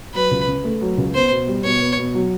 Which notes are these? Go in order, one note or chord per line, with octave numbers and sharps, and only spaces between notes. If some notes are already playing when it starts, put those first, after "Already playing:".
F#3 B4
C#2
C#3
A3
F#3
C#2
B3 C5
B2
G3
B2 C#5
B3
B2
F#3